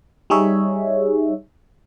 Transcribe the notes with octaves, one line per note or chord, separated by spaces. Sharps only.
G3 D#4 G#4 C#5 E5